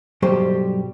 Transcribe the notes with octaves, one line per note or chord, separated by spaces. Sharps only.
B1 G2 F#3 G3 G4 C5